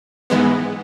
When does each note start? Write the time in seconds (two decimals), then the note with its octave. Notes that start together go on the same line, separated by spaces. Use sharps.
0.30 G#2 E3 G#3 B3